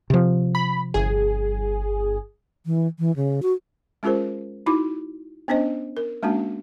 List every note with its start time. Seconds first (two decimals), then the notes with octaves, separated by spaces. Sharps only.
0.10 C3 F3
0.55 B5
0.94 G1 G#4
2.66 E3
2.99 E3
3.16 C#3
3.42 F#4
4.03 G#3 C#4 F4 G#4 A#4 C5
4.66 D#4 E4 F#4 D6
5.48 B3 C#4 D4 C5 D#5
5.97 A#4
6.23 G#3 A#3 C#4 D4 F#4